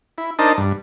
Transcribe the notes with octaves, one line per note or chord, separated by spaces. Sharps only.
E4
D4 D#4 A#4 C5 D#5 A5
G2